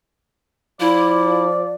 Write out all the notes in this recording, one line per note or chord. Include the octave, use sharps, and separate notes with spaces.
F3 E4 D5